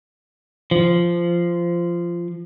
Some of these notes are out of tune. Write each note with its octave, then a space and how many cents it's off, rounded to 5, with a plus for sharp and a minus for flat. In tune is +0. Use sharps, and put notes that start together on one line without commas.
F3 -15